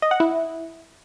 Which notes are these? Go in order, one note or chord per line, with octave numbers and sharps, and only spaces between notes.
D#5
F#5
E4